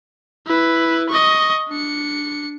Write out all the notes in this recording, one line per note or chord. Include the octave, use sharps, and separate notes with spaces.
E4 B4
D#5 C#6
D4 C#7